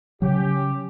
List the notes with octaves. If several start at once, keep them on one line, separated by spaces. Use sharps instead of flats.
C#3 F#3 C#4 G4